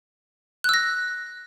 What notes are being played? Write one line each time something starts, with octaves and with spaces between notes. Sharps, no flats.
E6 F#6 A#6